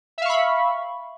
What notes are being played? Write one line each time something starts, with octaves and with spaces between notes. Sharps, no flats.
E5 F5 B5 C#6